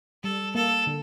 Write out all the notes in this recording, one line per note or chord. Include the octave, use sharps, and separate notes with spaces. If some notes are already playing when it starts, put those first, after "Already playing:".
G3 A4
A#3 A4
D3